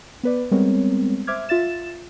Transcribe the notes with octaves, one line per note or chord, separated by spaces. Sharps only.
B3 B4 D5
G3 G#3 B3 C4 A#4 C#5
C5 E5 D6 F6 G#6
F4 E5 A6 E7